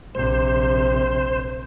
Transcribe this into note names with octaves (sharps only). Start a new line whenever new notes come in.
A#1 C3 C5